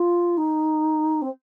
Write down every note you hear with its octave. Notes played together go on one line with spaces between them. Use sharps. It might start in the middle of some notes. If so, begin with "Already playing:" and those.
Already playing: F4
D#4
C4